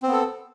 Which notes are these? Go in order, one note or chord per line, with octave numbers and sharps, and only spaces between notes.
B3 C4 A4